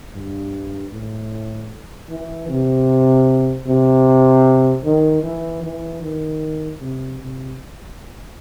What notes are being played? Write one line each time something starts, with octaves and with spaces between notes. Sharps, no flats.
G2
A2
E3
C3
C3
D#3
E3
E3
D#3
C3
C3